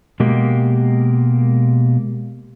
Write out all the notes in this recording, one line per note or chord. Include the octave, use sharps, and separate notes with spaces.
B2 G#3 A#3 G4